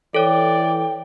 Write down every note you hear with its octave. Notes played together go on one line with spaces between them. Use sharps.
E3 A4 C#5 D5 G5